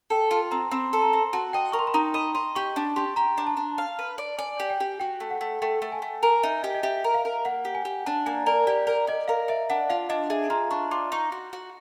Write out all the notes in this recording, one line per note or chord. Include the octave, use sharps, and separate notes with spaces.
A4 G5
F4 A5
C4 A#5
C4 B5
A4
A#5
C4
F#4 A5
D#5 G5
A#4 C#6
C6
B5
D#4 A#5
D#5 B5
D#5 C6
G4 C#6
D4
G4 C6
G4 A#5
D4
A5
D4
F5
B4
D5
D5 G#5
G4
G5
G4
F#4 G5
A3
F#5
A3
A3 G5
A3
G#5
A3
A#4 G#5
D#4 E5
G4 D#5
D#5
G4 E5
A#4
F5
A#4
A#3 F#5
G4
G#5
G4
D4 A5
A#3 G#5
A#4 D5
G4 D5
A#4 D5
D5 D#5
A#4 F5
D5 E5
D4 F#5
F4 F5
D4 D#5
G#4 E5
F4 A#5
D4 C#6
F4 D6
D#4 C#6
F#4
F#4